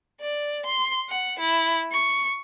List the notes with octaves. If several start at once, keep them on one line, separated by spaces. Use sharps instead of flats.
D5
C6
F#5
E4
C#6